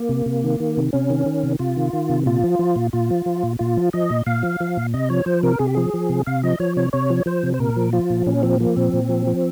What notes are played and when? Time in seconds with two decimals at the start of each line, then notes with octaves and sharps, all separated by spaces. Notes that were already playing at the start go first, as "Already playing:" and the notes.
Already playing: A#3
0.09 C3
0.26 C3
0.44 D#3
0.60 D#3
0.77 C3
0.93 C3 C#4
1.10 D#3
1.26 D#3
1.43 C3
1.59 C3 F4
1.76 D#3
1.93 D#3
2.09 C3
2.26 A#2 F4
2.44 F3
2.59 F3
2.76 A#2
2.93 A#2 F4
3.10 F3
3.26 F3
3.43 A#2
3.59 A#2 F4
3.77 F3
3.93 F3 D#5
4.10 A#2
4.26 A#2 F5
4.43 F3
4.60 F3
4.77 A#2
4.94 C3 D#5
5.10 F3 C#5
5.26 F3 C5
5.43 C3 A#4
5.59 C3 G#4
5.67 G4
5.75 F3 G#4
5.94 F3
6.10 C3
6.26 C3 F5
6.43 F3 D#5
6.60 F3 C#5
6.77 C3 C#5
6.93 C3 C#5
7.10 F3
7.26 F3 C5
7.43 C3
7.54 C5
7.59 A#2 A#4
7.76 F3
7.93 F3 F4
8.10 A#2
8.26 A#2 C#4
8.43 F3 C4
8.60 F3 A#3
8.76 A#2 C4
8.93 A#2
9.09 F3
9.27 F3